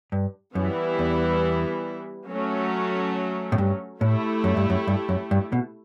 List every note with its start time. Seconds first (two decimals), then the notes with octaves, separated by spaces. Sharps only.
0.12 G2
0.55 F#2 E3 G3 B3 E4
0.99 E2
2.28 F#3 A3 C#4
3.52 A2
3.58 G2
4.01 A2 A3 E4 G4
4.44 F#2
4.57 G2
4.70 F#2
4.87 G2
5.09 F#2
5.31 G2
5.52 B2